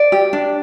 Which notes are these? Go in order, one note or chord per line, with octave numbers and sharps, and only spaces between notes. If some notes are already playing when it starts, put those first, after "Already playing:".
Already playing: D5
G4
D4